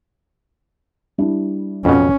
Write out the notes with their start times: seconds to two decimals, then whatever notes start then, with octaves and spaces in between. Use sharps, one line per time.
1.18 G3 D4 E4
1.85 F2 B2 C#4